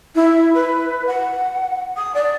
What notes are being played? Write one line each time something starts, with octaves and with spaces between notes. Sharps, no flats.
E4
B4
F#5
D#6
D5